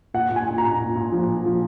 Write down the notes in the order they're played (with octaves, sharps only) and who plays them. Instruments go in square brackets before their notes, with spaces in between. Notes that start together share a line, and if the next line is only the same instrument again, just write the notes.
[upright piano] A#2 F#5
A#2
G#5
A#2
A#5
A#2
A#2
A#2
F3
A#2
F3